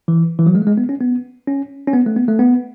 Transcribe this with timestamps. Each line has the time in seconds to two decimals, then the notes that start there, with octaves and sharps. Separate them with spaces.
0.08 E3
0.39 E3
0.46 F#3
0.55 G#3
0.62 A3
0.67 G#3
0.77 B3
0.89 C#4
1.00 B3
1.47 C#4
1.87 C#4
1.93 B3
2.06 A3
2.16 B3
2.28 A3
2.39 B3